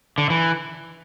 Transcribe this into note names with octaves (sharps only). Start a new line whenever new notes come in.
D3
E3